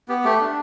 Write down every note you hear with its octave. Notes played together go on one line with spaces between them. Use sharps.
B3 G4
A3 G4
D4